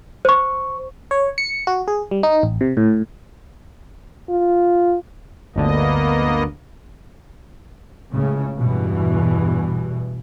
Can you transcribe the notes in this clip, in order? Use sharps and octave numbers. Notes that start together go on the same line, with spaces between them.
C5 C#6
C#5
C#7
F#4
G#4
G3
D#4
A1
C3
A2
F4
G1 D2 D3 A#3 B3 D#5
C#2 A2 C#3
E2 G2 B2 E3